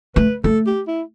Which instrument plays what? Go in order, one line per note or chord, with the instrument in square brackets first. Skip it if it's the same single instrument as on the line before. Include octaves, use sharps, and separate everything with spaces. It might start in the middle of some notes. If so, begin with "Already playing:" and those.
[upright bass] A3 [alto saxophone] B4
[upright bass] A3 [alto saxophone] A4
[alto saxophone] G4
E4